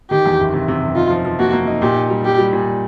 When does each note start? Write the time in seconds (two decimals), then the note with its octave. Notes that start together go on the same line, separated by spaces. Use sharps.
0.11 D#3 G4
0.26 E2
0.40 F#1
0.53 C3
0.68 C3
0.82 F#1
0.96 D#4 F4
1.10 F3
1.25 F3
1.39 A#3 F#4
1.53 A#3
1.67 D#4
1.82 A#2 G4
1.96 D#4
2.10 G3
2.25 G3 G4
2.38 G3
2.53 A#2